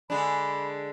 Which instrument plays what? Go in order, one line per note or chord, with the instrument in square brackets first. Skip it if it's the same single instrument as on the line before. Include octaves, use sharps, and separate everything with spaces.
[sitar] D3 G#3 D4 [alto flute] B5